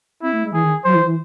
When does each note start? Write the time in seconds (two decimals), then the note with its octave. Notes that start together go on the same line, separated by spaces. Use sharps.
0.22 C4 E4
0.33 A3
0.44 G#3
0.53 E3 G#4
0.64 D#3
0.85 F#3 C5
0.95 E3
1.05 E3